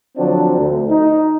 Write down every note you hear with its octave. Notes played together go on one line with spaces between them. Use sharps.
D3 F3 F#3 C4 D4
D2
D#4